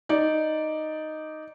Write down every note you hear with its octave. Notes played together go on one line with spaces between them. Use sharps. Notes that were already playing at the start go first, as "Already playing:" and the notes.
D#4 D5